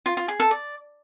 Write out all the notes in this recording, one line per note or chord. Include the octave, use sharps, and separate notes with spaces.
F4
F4
G#4
A4
D5